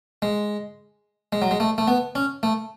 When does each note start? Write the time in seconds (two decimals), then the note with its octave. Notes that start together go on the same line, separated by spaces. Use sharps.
0.22 G#3
1.32 G#3
1.42 F#3
1.51 G#3
1.60 A3
1.78 A3
1.88 B3
2.15 C#4
2.43 A3